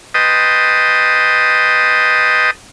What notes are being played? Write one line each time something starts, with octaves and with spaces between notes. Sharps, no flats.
B4 D#5 G5 A5 C6 D#6